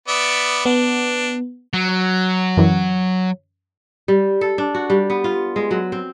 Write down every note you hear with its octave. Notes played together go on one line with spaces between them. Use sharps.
B3 D5 E5
B3 D4
F#3
F#2 E3
G3
A4
D4
F#4
G3
B3
F4
G#3
F#3
C4